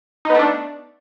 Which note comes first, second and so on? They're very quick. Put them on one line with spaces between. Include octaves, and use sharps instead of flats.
D#4 B3 A3 D4